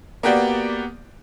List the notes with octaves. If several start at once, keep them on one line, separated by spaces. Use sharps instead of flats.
A#3 B3 F#4 G4 D5